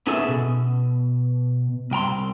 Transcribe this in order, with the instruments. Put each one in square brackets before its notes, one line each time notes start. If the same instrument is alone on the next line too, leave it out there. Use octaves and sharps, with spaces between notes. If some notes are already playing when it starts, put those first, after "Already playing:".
[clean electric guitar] B3 C#4 D#4 G#4 A4 E5
B2
C2 G5 A#5 C6